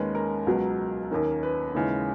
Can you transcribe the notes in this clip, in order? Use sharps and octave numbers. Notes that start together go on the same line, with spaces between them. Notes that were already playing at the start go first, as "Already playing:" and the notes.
Already playing: D#2 D#3 G#3 C#4 B4
A#4
C#2 B2 F#3 B3
D#2 D#3 A#3 C#4
B4
D#2 C#3 E3 G#3